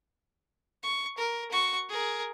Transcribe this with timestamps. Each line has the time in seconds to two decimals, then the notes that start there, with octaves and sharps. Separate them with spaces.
0.83 C#6
1.18 A#4
1.51 F#4 C#6
1.89 G#4 A#4